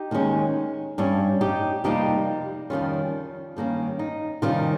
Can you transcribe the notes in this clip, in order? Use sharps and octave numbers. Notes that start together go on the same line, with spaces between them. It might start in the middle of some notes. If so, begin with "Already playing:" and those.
Already playing: D#4 G4
D#2 D#3 G#3 C#4
G2 G3 C#4
D#4 G4
F2 C3 G3 A#3 D#4 G4
F2 D#3 G3 C#4 F4
G2 D#3 A#3 C#4
D#4
C3 D#3 G3 C#4 F4